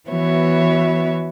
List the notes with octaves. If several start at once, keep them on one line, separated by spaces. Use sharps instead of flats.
E3 B3 F#4 C#5 E5